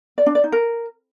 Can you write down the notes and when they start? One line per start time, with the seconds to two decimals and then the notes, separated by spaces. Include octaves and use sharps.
0.18 D5
0.26 D4
0.35 D5
0.44 D#4
0.52 A#4